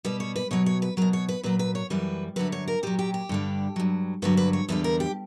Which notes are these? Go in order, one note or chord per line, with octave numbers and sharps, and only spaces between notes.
B2 G3 B4
C#5
B4
B2 F#3 C#5
C#5
B4
B2 F#3 A#4
C#5
B4
A#2 F#3 B4
B4
C#5
F#2 E3 G3 B4
F#2 D3 F#3 B4
C#5
A#4
A#2 F#3 G4
G4
G4
G2 D3 G3
G2 F#3
G2 D3 F#3 B4
B4
C#5
E2 D3 G3 B4
A#4
G4